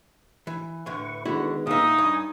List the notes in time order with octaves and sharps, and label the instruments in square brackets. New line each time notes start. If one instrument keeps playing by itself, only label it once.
[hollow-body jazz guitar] E3
[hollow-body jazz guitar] A2 D3 [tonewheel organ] B4 C#6
[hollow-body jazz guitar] D3 E4 F#4 [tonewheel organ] D#3 G#3 B3
[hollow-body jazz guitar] A#2 E5 [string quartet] D#4 [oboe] D#6
[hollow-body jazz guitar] G2 [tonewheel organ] G#5